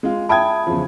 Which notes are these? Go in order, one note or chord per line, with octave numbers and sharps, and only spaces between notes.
G#3 F4
E5 G5 A5 B5 D#6 G#6
E2 C#3 F3